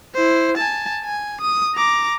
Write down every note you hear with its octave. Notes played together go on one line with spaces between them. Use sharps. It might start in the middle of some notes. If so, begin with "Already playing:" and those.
E4 C5
G#5 A5
G#5
D#6
A#5 D6